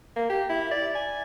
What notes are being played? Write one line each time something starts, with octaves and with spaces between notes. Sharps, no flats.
A#3
G4
E4
D5
G#5